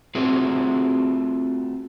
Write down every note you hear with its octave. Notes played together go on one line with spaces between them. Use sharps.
A3 C4 F4 F#4 G#4 B4